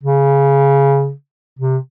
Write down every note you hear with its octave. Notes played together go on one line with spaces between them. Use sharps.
C#3
C3